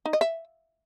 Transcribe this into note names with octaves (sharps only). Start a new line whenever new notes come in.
D#4
D#5
E5